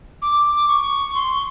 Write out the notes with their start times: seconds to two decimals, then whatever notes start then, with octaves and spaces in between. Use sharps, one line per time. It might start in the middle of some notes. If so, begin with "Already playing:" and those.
0.22 D6
0.68 C#6
1.15 C6